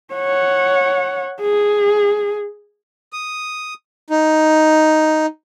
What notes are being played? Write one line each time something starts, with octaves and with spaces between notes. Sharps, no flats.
C#5 F#5
G#4
D#6
D#4